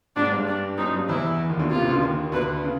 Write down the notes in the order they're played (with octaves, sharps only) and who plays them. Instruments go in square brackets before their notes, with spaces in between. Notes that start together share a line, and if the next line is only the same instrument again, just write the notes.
[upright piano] G#2 G#3 [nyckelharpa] D4
[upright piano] G2 G3
[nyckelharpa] D4
[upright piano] F#2 F#3 [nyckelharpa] D#4
[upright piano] G2 G3
[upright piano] E2 E3 [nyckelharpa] E4
[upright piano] D#2 D#3
D2 D3
[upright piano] C3 [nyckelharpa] F4
[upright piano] C#2 C#3
D2 D3
D#2 D#3
[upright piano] D2 D3 [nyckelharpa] B4
[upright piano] C#3